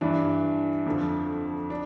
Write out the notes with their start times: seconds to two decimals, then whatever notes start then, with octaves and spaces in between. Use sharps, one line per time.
0.01 G2 E3 D4
0.86 F2 D3 F3
1.70 D4